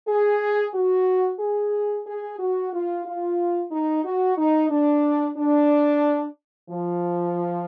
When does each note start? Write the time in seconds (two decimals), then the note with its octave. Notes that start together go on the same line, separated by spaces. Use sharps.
0.08 G#4
0.74 F#4
1.40 G#4
2.06 G#4
2.39 F#4
2.73 F4
3.05 F4
3.71 D#4
4.05 F#4
4.38 D#4
4.70 D4
5.37 D4
6.70 F3